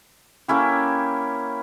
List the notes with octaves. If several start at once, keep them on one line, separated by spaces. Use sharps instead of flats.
A#3 C#4 E4 G4